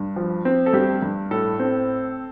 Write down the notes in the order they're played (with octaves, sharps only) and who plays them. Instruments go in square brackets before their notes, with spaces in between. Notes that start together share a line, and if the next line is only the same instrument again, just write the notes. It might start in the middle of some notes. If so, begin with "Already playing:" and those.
Already playing: [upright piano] G2
F3
C4
A4
G2 G4
G2
A2 A4
C4